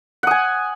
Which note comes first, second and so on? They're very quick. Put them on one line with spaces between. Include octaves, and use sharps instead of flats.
F#5 D#6 G#5